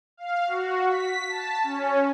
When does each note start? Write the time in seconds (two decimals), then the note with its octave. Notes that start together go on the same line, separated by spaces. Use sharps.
0.17 F5
0.47 F#4
0.87 B6
1.29 A5
1.64 C#4